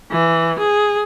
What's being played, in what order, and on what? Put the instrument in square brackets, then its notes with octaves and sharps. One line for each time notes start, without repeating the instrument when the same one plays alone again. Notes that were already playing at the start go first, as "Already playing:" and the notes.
[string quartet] E3
G#4